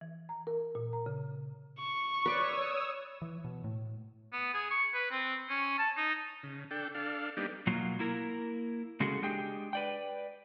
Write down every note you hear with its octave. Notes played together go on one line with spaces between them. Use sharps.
E3
A#5
A#4
A#2
A#5
C#3
C#6
B4 C#5 D5 D#6 E6
E3
B2
A2
B3
G#4
C#6
B4
C4
C#4
A5
D#4
C#3
D4 A4 G5
D4 A4 F5
G3 A#3 B3 D4 D#4 G4
B2 F#3 A#3 F4
A#3 E4 A#4
C#3 G#3 C#4 F#4 G#4 A4
G#3 D4 G4 G#4 G5
B4 D5 G5